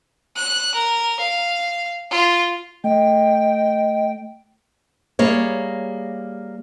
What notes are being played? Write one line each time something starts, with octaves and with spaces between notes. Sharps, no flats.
F#6
A#4
F5
F4
A3 D#5 G5
G3 A#3 G#4 C#5